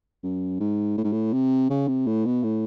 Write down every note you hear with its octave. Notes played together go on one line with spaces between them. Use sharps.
F#2
G#2
A2
G#2
A2
C3
C#3
C3
A2
B2
A2